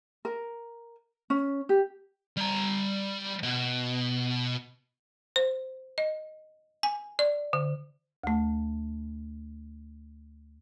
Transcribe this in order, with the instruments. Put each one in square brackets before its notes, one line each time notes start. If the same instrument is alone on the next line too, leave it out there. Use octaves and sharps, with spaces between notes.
[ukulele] A#4
C#4
G4
[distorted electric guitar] G3 A#5
B2
[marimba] C5
D#5
G#5
D5
D3
D2 A3